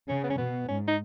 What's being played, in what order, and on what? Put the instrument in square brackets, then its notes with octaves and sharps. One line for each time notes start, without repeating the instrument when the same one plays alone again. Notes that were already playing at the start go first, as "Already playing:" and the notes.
[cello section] C#3 [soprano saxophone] C#4
[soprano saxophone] B3
C#4
[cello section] B2 [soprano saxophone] B3
[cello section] G#2 [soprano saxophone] C#4
[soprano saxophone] D#4